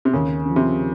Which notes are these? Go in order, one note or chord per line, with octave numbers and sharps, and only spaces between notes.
C3
D#2 C#3
C#3 F3
C3